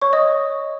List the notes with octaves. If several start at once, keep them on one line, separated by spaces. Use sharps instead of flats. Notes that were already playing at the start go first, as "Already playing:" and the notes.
C#5 C#6
D#5 D#6